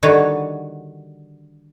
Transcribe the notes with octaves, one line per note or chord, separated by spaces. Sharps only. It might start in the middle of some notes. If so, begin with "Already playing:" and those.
D3 D#3 G3 F#4 B4 C#5